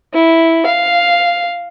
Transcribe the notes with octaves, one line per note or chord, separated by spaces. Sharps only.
E4
F5